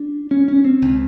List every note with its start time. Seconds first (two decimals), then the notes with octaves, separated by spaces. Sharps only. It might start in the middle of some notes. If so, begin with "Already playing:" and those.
Already playing: D4
0.31 C#4
0.48 C#4
0.65 C4
0.82 C#2 C#3